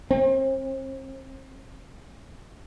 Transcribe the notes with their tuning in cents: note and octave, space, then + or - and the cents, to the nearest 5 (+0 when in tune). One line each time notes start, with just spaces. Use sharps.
C4 +40